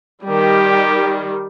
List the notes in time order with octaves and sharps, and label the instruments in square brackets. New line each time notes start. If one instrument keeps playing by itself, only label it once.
[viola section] D#3 G3 [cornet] G4